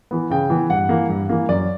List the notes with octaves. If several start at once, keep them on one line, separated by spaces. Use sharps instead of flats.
E3 B3
C#3 G5
E3 B3
G2 F#5
E3 A#3
G2
E3 A#3
F#2 D5